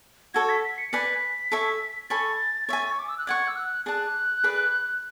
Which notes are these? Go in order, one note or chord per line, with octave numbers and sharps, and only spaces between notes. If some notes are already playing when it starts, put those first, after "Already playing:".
F#4 A4 C#5 G#6
B6
B6
C#7
B4 D5 G#5 B6
A4 C#5 E5 G#5
A4 C#5 G#5 B5 A6
C#5 E5 G#5
C#6
D6
E6
F#6
D5 F#5 C#6 G#6
E6
F#6
G#4 D5 A5 F#6
G#4 B4 D5